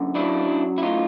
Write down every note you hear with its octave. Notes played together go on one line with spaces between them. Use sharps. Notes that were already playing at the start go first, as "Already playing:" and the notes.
Already playing: F#2 D3
F#3 D4 E4
F#2
E4
A2 D#4 F4